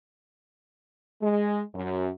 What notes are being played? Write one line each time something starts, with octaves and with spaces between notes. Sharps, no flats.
G#3
F#2